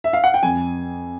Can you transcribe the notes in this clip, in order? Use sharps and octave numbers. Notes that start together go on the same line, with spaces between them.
E5
F5
F#5
G5
F2 G#5